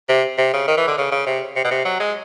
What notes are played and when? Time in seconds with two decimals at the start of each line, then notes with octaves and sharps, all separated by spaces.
0.09 C3
0.38 C3
0.53 C#3
0.68 D#3
0.77 E3
0.87 D3
0.97 C#3
1.12 C#3
1.26 C3
1.56 C3
1.64 B2
1.71 C3
1.85 F#3
2.00 G#3